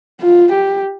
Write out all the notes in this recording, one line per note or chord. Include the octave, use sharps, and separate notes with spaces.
F4
G4